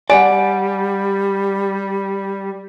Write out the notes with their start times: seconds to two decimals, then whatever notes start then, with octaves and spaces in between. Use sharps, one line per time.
0.10 G3 D5 F#5 G#5